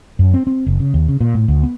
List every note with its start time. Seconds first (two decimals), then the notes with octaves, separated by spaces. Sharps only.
0.19 F#2
0.34 C4
0.47 C4
0.66 F#1
0.80 C#3
0.94 D#2
1.09 C#3
1.21 A#2
1.35 A2
1.48 D2
1.63 B3